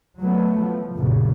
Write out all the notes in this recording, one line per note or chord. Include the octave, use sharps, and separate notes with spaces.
F#3 A3 B3
F3
A#1 F#2 A#2 C#3